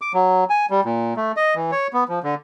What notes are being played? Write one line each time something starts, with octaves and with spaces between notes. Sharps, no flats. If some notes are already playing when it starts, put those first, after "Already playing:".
D6
F#3
G#5
G3
A#2
A3
D#5
E3
C#5
B3
F3
D3